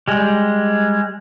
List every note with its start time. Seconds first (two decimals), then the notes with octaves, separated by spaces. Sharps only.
0.08 G3 G#3